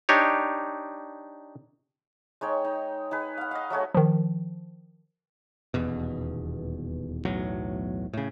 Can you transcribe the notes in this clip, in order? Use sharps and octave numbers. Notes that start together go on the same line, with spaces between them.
D4 D#4 G4 C#5
G#3 D#4 C#5 G5
D#4
D#4 G#4 B4
F5 F#5
D#5 F5
F#3 A3 F#4 G#4
D#3 F3
D#1 E2 B2
B1 E2 A2 F#3
A2 C#3